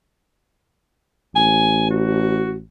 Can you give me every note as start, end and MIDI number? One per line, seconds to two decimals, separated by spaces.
1.36 2.63 33
1.36 1.87 80
1.90 2.53 66